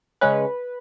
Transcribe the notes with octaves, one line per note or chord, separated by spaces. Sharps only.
C#3 G#3 C#4 B4